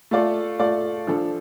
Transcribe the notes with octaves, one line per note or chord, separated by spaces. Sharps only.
A3 F4 A4 D5
A3 F4 A4 D5
F3 D4 A4